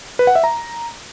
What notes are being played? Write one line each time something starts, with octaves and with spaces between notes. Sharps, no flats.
B4
F#5
E5
A#5